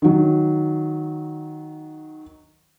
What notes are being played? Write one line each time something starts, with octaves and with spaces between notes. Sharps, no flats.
D#3 F#3